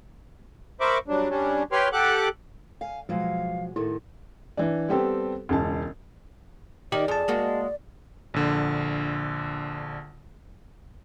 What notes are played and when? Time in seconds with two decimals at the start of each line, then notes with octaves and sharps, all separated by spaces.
0.81 A#4 C5 E5 B5 C#6 D6
1.08 F#3 G3 D4
1.30 G3 C#4 D4
1.72 G4 B4 C#5 G5 C6 F6
1.93 G4 A4 F#5 D6 F#6
2.81 F5 G#5
3.09 B2 F3 F#3 G#3 F5
3.76 A2 D#3 A3 E4
4.57 E3 D4
4.89 G3 B3 C4 G4 A4
5.49 E1 C#2 A5
6.92 D#3 D#4 G4 D5
7.08 F2 G#4 A5
7.28 G#3 A#3 F#4
8.34 A#1 D3